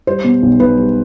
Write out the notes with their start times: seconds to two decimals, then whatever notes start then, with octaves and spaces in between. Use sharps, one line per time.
0.07 G3 C5
0.24 B2
0.42 B1
0.60 B1 B4
0.77 G3